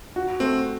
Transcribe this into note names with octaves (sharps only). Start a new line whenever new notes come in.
F#4
A3 C4